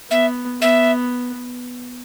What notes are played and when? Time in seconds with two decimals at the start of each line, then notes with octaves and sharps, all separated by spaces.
0.11 B3 E5
0.61 B3 E5